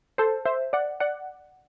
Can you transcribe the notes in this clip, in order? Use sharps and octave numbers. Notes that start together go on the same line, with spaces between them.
A4 C5
C5 E5
D5 F#5
D5 F#5